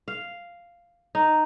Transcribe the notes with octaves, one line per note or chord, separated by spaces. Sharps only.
F5
D#4